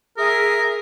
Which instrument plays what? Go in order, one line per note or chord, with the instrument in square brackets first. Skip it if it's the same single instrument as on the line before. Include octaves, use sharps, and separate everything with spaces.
[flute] G#4 [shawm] A#4 [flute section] E5 D#6